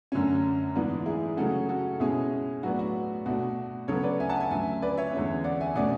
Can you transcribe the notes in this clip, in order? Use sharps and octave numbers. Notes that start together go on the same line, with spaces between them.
F#2 D3 A3 C#4
G#2 E3 B3 D4
E4 G#4
C#3 F#3 A3 C#4 F#4 A4
F#4 A4
B2 G#3 C#4 E4 G#4
A2 F#3 B3 D4 F#4
F#4
B2 A3 D4 F#4
C#3 F#3 B3 A4 C#5
B4 D5
E5 G#5
F#5 A5
E5 G#5
D2 D3 F#3 C#4 E5 G#5
B4 D5
C#5 E5
E2 D3 G#3 C#4
D5 F#5
E5 G#5
B2 A3 C#4 D5 F#5